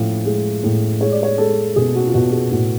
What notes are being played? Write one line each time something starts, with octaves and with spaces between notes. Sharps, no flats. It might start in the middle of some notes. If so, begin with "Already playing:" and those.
Already playing: A2 F3 F5
G#3
A2
G#3 C#5
D5
C#5
G#3 A4
B2 G#4
F#4
F4
B2 F#4
G#4
A2 F#4